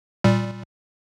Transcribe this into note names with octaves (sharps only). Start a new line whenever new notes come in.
A#2 G3